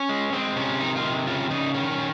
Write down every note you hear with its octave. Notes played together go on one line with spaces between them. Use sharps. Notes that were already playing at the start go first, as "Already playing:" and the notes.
Already playing: C#4
G#3
G#3 C4
C3 C#4
D#3 D#4
F4
C3
C#3 F4
C#3 D#4
D#3 C#4
C#4
D#3